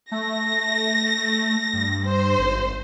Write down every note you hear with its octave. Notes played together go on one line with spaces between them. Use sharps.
A3 A#6
G2
C5
G#1